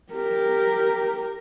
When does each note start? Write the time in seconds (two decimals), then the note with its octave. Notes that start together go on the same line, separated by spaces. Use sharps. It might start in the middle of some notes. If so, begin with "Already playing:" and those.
0.13 G4 A#4